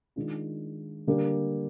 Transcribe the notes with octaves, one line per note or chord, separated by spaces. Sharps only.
D#3 G#3 D4 F4
D3 G3 A#3 D4 G4